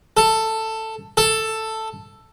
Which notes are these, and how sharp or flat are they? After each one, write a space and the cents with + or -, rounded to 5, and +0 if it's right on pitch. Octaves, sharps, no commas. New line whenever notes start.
A4 +10
A4 +5